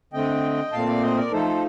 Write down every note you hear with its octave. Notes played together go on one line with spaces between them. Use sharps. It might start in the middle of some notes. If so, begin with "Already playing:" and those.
D3 A3 C4 D#5 G5
A#2 A3 C4 F5 A5
D5 F5
C5 D#5
A#4 D5
F3 A3 D#4 A4 C5